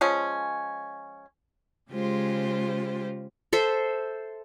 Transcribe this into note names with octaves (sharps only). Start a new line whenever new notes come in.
F3 G#3 C#4
C#3 G#3 F4 G4 C5
A4 C5 E5